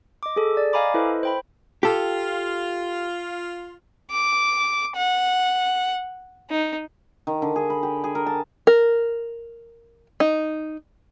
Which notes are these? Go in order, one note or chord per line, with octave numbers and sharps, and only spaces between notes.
D#5 D6
G#4 A4
D5
D#5 F5 G#5 A#5 B5 D6
E4 A4 B4 C5 D#5
C5 G5 B5
F4 G4 A4
D6
F#5
D#4
D#3
D3
G#4
B5
G4
G#4
A#4
A5
A#4
D#4